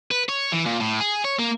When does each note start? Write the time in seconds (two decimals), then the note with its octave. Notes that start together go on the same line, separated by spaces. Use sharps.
0.11 B4
0.29 C#5
0.53 E3
0.66 A#2
0.80 A2
1.00 G#4
1.25 C#5
1.39 A#3